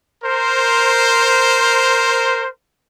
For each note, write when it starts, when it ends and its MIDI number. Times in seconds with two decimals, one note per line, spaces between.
0.24 2.48 70
0.24 2.48 72